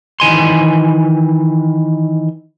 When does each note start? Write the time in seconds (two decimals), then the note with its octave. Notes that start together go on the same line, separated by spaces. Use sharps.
0.20 D#3 E3 G#5 C6